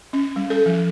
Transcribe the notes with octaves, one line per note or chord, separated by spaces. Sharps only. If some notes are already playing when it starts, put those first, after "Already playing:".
C#4
G3
A4
F3